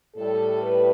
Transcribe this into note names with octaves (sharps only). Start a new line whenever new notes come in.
A2 G3 A4
B4